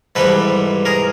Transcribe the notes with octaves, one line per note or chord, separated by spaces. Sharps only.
G#2 E3 G3 A4 B4
G#4 A#4